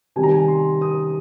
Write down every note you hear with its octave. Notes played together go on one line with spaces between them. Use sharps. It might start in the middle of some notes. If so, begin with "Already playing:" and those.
C3 D#3 G3 G#5
A#5
G#5
C6
D#6